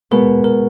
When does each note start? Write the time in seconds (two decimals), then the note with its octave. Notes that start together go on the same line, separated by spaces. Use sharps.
0.11 B2 G#3 B3 A#4
0.44 A#4